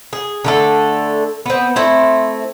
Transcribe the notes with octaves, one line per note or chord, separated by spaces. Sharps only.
G#4
D3 A3 A4
B3 C4
A3 C4 E4